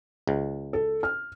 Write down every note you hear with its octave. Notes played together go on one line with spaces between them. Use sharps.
C#2
A4
F6